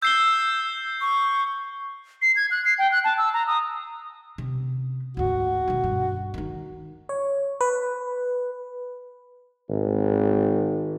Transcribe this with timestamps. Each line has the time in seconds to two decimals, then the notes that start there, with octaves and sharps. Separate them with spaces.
0.02 E6 G6 C7 G7
1.01 C#6
2.22 C7
2.36 G#6
2.51 F#6
2.65 C7
2.78 G5
2.92 F#6
3.04 A5
3.18 E6
3.33 A#5
3.47 D#6
4.38 C3 C#4
5.17 D2 G#2 F#4
5.68 B2 D#3
5.84 G2
6.34 D#3 D#4
7.09 C#5
7.61 B4
9.69 G#1